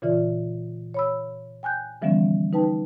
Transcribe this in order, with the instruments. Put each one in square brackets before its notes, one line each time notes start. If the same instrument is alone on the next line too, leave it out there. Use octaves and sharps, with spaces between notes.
[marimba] A#2 C#3 E3 F4 D5
C#5 B5 E6
G5 G#5 F#6 G6
D3 E3 F3 G3 B3 C#4
D#4 B4 G5 A5